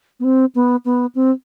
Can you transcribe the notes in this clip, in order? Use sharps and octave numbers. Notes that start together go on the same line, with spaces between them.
B3
C4
B3
B3
C4